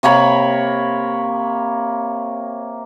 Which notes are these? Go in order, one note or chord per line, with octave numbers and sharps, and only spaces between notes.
C3 A#3 C#5 B5